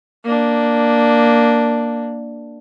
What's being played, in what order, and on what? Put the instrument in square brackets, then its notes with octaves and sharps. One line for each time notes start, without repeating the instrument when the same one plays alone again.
[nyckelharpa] A#3 D4